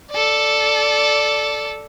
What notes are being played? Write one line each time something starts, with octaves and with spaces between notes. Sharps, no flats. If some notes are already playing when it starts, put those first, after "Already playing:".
A4 D5